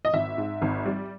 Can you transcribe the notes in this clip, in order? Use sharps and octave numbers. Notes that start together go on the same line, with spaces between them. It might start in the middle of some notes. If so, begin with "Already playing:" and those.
D#5
G#1 E5
G#2
G#1
G3